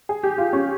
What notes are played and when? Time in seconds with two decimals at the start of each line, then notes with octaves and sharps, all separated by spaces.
0.09 G#4
0.23 G4
0.38 F4
0.53 C#4